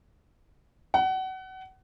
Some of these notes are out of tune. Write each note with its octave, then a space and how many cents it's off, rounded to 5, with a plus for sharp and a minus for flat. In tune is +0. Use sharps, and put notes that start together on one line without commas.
F#5 +30